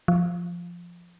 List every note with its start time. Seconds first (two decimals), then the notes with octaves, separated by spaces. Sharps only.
0.08 F3